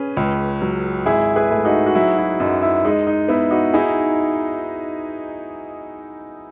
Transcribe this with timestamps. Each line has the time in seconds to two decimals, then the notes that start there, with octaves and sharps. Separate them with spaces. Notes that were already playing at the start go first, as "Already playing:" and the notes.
Already playing: C#4 G#4 B4
0.17 C#2
0.62 F#3
1.06 G#1 E4 G#4
1.36 G#4 B4
1.51 A3
1.65 D#4 F#4
1.86 F#4
1.95 F#3 E4
2.18 E4
2.40 F#2 D#4
2.62 E4
2.85 G#3 D#4
3.07 D#4
3.28 B3 E4
3.51 D#4 F#4
3.74 D#4 E4 G#4